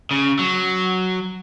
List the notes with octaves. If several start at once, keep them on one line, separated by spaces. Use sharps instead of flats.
C#3
F#3